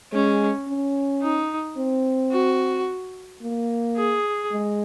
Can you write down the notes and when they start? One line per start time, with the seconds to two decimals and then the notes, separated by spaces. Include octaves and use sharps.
0.13 G#3 C#4
0.68 C#4
1.22 D#4
1.77 C4
2.32 F#4
3.43 A#3
3.98 G#4
4.52 G#3